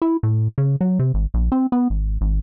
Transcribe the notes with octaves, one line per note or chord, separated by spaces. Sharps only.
E4
A2
C#3
F#3
C3
G#1
A#1
C4
B3
G#1
G#1